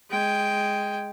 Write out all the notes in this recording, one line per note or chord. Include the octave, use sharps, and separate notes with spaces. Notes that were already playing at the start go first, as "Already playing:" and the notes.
G#3 G5